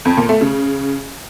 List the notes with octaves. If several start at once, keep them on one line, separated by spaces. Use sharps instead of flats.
F2
A#2
A3
C#3